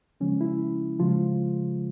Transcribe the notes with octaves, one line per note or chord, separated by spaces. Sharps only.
C#3 F3 G#3 C#4
E4
C#3 F3 G#3 F4